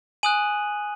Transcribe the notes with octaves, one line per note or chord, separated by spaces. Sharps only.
G#5 D#6 F#6 D#7 F#7